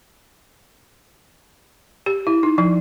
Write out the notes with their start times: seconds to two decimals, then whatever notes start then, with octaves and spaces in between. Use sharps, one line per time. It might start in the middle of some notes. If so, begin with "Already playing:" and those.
2.06 G4
2.27 E4
2.43 D#4
2.58 F3